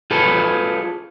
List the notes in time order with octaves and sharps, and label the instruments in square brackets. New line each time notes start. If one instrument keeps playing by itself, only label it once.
[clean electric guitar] F4 G#4 A4 B4